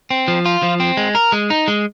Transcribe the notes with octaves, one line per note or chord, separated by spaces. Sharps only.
C4
F3
F4
F3
C4
G#3
A#4
G#3
D#4
G#3